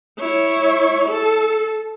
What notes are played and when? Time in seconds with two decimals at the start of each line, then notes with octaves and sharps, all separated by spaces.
0.19 E4 C#5
1.09 A4